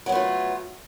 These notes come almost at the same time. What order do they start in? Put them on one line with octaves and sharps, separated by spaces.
F#3 B3 A3 F4